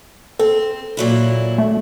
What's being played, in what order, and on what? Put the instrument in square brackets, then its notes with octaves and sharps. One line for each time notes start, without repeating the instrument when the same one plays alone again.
[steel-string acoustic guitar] C4 [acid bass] A4
[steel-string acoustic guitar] A#2 F#3 E4
[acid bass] A3